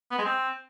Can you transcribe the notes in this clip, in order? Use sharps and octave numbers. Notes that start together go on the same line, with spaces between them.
B3
G#3
C4